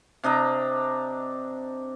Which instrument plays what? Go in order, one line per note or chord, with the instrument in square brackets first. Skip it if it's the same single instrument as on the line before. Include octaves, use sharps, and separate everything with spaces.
[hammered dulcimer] C3 D4 D#5 A#5